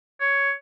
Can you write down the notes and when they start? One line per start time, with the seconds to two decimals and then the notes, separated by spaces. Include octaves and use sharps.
0.20 C#5